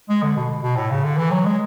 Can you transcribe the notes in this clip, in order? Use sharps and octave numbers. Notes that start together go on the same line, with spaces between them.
G#3
D3
B2
B2
B2
A2
C#3
D3
E3
F#3
G#3